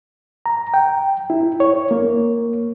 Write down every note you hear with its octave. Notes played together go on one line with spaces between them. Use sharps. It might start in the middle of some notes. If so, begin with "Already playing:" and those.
A#5
G5
E4
C#5
A#3